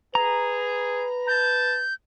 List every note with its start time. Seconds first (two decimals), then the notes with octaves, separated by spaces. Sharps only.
0.15 G#4 B4 A#5
1.28 A5 G6